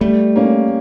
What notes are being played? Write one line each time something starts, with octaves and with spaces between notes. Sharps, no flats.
G3 A3
A#3 C#4